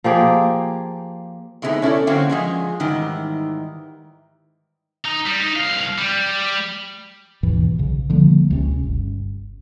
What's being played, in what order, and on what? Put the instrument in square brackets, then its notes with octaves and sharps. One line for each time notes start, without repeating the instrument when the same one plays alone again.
[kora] F3 A#3 G4 G#4
[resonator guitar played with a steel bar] A2 C3 G#3 A#3 B3 D#4
C#4 E4 A4 D5
D3 F#3 A#3 C4 C#4
F3 G#3 G#4
G#2 D#3 E3 G3
[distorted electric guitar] D#4
G3
D#4
C2 F5
G3
[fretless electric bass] D#2 G#2 B2 E3
B1 C#3
D3 F3 G3 A#3
C#2 C3 C#4
G1